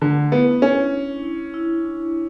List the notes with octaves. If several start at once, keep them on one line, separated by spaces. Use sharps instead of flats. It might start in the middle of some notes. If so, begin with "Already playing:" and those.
D3 A3
B3 E4
C#4 D4
D4
E4
E4
D4